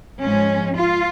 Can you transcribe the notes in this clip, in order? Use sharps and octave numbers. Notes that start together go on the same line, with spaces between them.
G#2 F3 G#3 C#4
F4